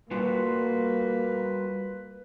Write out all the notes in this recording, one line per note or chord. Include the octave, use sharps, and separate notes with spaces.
G3 A#3 F4 F#4 B4